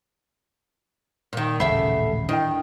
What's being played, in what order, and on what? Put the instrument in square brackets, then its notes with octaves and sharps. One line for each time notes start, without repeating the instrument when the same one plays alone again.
[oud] A#2 D#3
[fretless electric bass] D#1 A1 C#3 [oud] A3 E5 [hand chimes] F#5 B5 C7
[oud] D#3 [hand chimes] D4 E4 G5